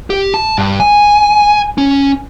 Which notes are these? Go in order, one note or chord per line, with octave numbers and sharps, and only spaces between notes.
G4
A5
G2
G#5
C#4